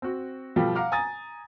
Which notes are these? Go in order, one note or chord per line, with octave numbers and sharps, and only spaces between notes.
C4 F#4
B2 F3 G3 F4 G4 A4
F5 F#5 A#5 D6 F6
G#5 A#5 D#6 A6